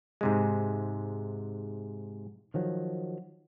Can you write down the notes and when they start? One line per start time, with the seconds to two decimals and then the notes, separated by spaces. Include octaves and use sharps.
0.21 G#2 C3 G#3
2.54 D#3 F3 F#3